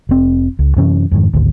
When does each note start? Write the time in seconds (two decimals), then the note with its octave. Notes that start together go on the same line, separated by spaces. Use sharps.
0.09 F1 C4
0.59 C#2
0.77 F#2 C3 E3 C#4
1.11 F2 G#2 D#3
1.34 G#1 D2